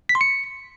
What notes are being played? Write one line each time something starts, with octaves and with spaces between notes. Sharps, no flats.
B6
C6
C#7